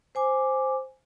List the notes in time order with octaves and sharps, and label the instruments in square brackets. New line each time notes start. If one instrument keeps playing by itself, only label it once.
[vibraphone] C5 G#5 D6